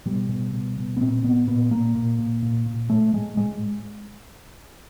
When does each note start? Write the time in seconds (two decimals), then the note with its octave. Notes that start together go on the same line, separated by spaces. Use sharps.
0.06 B2 G3
0.29 B2
0.53 B2
0.78 B2
0.97 B3
1.01 A#2 C4
1.24 A#2 B3
1.48 A#2 B3
1.71 A#2 A#3
1.95 A#2
2.19 A#2
2.43 A#2
2.66 A#2
2.89 A2 A3
3.13 A2 G#3
3.37 A2 G#3